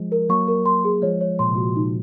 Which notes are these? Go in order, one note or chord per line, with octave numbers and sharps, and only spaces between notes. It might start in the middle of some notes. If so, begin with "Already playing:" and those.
Already playing: F3 G#3
A#4
F#3 A#3 C#6
A#4
C6
G#4
F3 G#3 C#5
C#5
A#2 C6
C3
A#2 F#4
D#4